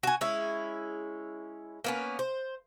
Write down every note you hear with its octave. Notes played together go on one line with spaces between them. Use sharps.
F#4 G#5
G#3 C#4 E4
A#3 B3 C#4
C5